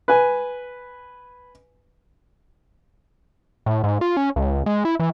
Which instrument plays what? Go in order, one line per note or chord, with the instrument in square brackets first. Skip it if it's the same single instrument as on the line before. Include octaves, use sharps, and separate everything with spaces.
[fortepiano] B4 G#5
[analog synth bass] A2
G#2
F4
C#4
C#2
G#3
E4
E3